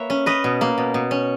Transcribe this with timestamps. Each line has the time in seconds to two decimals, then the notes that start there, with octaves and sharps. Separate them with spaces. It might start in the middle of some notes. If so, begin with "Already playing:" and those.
Already playing: A#3 B4 C#5 E5
0.10 C#4
0.26 C#4 B4 D#5
0.44 B2
0.61 A#3
0.78 B2
0.94 B2
1.11 C#4